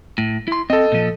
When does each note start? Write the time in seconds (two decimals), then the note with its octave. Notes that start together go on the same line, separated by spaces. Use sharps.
0.18 A2
0.48 E4 C6
0.70 C4 A4 D#5
0.92 A#2 F3